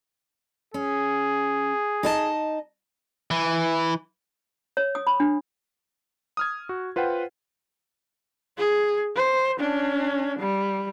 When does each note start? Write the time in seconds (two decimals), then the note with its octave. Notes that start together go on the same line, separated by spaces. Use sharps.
0.74 C#4 G#4
2.03 D#4 D#5 A5
3.31 E3
4.77 C#5
4.95 D#6
5.07 B5
5.20 D4
6.37 D#6 F6 G#6
6.69 F#4
6.96 F4 B4 C5 F#5 G5
8.58 G#4
9.16 C5
9.59 C#4 D4
10.39 G3